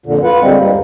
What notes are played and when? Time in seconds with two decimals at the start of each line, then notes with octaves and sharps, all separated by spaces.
0.06 F2 A#2 D3
0.23 F4 B4 F#5
0.41 D3 G3 G#3 C4
0.58 G2 G3 A#3
0.71 D#2